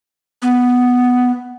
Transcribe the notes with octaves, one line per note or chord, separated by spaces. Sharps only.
B3